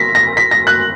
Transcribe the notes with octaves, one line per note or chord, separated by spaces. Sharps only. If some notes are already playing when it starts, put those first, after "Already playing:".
Already playing: A#6 B6
A#6
B6
A#6
F#6